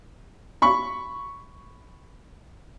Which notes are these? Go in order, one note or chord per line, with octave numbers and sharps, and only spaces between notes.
B5 C#6